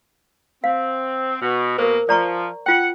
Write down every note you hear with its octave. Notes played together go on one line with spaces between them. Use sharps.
C4 F5
B2
B2 A#3 A#4 C5
F3 D5 A#5 C#6
F4 F#5 G5